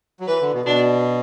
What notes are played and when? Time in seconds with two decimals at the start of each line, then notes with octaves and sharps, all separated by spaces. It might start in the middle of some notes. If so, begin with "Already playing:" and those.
0.20 F#3
0.27 E3 B4
0.41 D3
0.54 B2
0.65 B2 D4